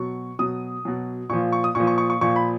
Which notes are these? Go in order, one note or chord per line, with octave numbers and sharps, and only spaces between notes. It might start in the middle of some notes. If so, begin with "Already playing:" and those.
Already playing: B2 F#3 C#6
B2 F#3 D#6
B2 F#3
A#2 F3 C#6
C#6
D#6
A#2 F3 C#6
C#6
C#6
C#6
A#2 F3 C#6
B5